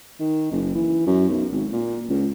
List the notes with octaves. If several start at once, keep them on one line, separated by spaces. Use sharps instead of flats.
D#3
F#1
E3
F#2
B1
G#1
A#2
C#2